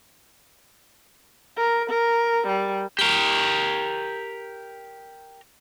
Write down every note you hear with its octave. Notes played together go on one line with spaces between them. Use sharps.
A#4
A#4
G3
G4 A#4